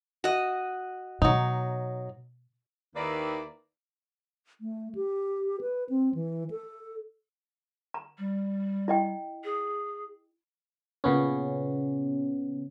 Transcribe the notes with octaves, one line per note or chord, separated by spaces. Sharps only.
F#4 D#5
B2 F#3 D#4
D#2 D#3 A#3 E4 B4 D5
A3
G4
B4
C4
E3
A4
A#5
G3
E4 D#5 G5
G#4
A#2 C#3 B3 C#4